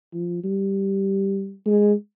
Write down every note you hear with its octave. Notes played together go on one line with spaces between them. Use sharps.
F3
G3
G#3